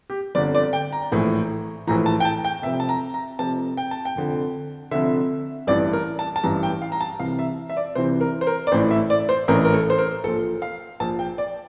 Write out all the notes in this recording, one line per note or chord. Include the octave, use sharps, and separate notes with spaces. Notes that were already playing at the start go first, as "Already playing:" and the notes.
G4
G1 F2 D3 D5
D5
G5
A#5
A#1 A2 E3
A#1 A2 E3 A#5
A5
G5
A5
G5
F1 F2 C3 E5
A5
A#5
A#5
F1 F2 C3 A5
G5
A5
G5
F1 F2 D3
F1 F2 D3 E5
A1 G2 E3 D5
A#4
A5
A5
A1 G2 E3 A#5
G5
F5
A#5
A5
C2 C3 E3 F5
E5
E5
D5
C2 C3 E3 C5
A#4
C5
A#4
D5
A1 A2 E3 C5
E5
D5
C5
A1 A2 E3 A#4
A#4
A4
C5
A#4
A#1 A#2 A4
F5
A#1 A#2 A5
G5
D5